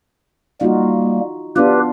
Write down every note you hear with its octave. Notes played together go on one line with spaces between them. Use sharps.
G3 A#3 D#4 F4 F#4
B3 D4 F4 G4 B4